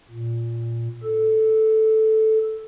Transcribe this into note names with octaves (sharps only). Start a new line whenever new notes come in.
A#2
A4